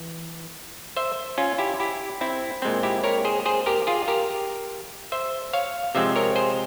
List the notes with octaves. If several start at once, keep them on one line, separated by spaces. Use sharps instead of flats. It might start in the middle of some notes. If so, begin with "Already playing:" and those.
Already playing: E3
C5 E5
C#4 F4
E4 G4
E4 G4
C4 E4
A#2 G#3 C4
E4 G4
A#4 C#5
G#4 C5
G#4 C5
G4 A#4
F4 G#4
G4 A#4
C5 E5
C#5 F5
C3 F3 G#3 C4 C5 E5
A#4 C#5
G#4 C5